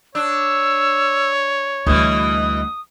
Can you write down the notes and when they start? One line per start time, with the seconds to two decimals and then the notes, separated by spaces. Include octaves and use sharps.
0.15 D4 C#5 E6
1.87 D2 B2 E3 G3 D#6